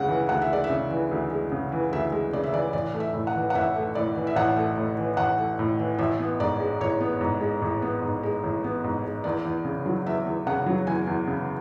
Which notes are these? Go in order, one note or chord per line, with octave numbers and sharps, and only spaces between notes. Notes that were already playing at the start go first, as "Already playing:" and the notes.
Already playing: D2 C#3 G#3 F#5
E3
D2 F#5
E5
G#3 D5
E5
C#3
E3
D2
G#3
C#3
E3
D2 E5
G#3
C#3 D5
E5
E3 D5
A1 D5
A3
E5
A2
F#5
E3
F#5
A1 E5
A3
A2 D5
E3
E5
A1 F#5
A3
A2
E3
A1 F#5
A3
A2
E3
A1 E5
B3
G#2 D5
G#3
A1 C#5
B3
G#2
G#3
A1
B3
G#2
G#3
A1
B3
G#2
G#3
E2 D5
E2
C#3
F#3
E2 E5
E2
C#3 F#5
F#3
E2 G#5
E2
C#3